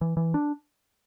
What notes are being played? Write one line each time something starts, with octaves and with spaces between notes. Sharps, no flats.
E3
E3
D4